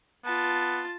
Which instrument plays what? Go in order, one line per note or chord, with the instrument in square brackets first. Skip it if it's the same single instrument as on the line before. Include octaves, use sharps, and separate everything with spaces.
[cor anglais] B3 [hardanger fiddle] F4 A5